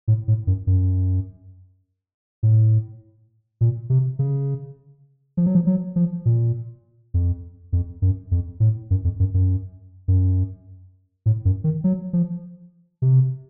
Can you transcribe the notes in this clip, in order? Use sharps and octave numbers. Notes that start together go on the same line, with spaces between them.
A2
A2
F#2
F#2
A2
A#2
C3
C#3
F3
F#3
F3
F#3
F3
A#2
F2
F2
F#2
F2
A2
F#2
F2
F#2
F#2
F#2
A2
F#2
D#3
F#3
F3
C3